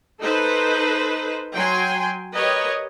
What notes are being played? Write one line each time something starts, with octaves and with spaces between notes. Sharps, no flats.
D#4 A4 B4 C5
F#3 G5 G#5 C6
G4 A#4 B4 C#5 D#5